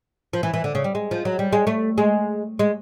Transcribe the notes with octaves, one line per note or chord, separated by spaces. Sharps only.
F3
E3
E3
D3
C#3
G3
G#3
F3
F#3
G3
G#3
A3
G#3
G#3